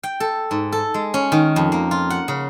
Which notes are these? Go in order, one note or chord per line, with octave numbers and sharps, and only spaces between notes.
G5
A4
G#2
A4
G#3
C#4
D#3
F2
A#3
F4
F#5
C#3